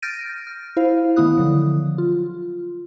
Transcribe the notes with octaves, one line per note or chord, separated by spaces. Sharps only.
F6 G6 A6 A#6 D7 D#7
F6
E4 C5 F5
D#3 A3 B3 E4 D#6 F#6
D3 F3 F#3
F4